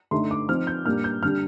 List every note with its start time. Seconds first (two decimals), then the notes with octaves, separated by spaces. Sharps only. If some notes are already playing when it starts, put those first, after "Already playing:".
0.11 D3 A3 D#4 C6
0.31 D6
0.49 F3 C4 D#4 F6
0.67 G6
0.86 A#2 G3 A#3 D4 F6
1.04 G6
1.23 D3 G3 D4 F6